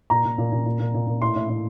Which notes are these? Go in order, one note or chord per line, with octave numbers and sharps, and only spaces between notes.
A#2 A#5
A#2
A#2
A#2
A#2
A#2
A#2
A#2
A2 C6
A2
A2